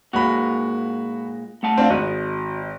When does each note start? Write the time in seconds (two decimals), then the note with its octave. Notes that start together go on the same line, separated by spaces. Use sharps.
0.13 A#2 G#3 A#3 F#4 B5
1.63 A3 F#5 A5
1.78 C4 D4 F4
1.90 G#1 F#4 D#5